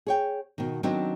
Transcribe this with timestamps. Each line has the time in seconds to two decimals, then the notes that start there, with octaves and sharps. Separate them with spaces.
0.07 G#4 C#5 G5
0.58 B2 D#3
0.83 D#3 F#3 B3 C4 D4 D#4